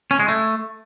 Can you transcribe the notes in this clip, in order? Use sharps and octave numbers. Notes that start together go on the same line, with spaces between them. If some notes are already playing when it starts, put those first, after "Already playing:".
C#4
G#3
A3